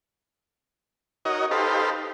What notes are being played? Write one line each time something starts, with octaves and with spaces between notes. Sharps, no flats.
D#4 F#4 A#4 C#5 D#5
D#4 G4 A4 B4 C5 F5